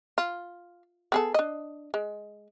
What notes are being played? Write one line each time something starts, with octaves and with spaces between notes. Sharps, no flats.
F4
B3 G#4 A4
D4 D#5
G#3